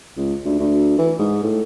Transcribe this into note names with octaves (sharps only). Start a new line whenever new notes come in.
C#2
D2
D2
E3
G#2
A2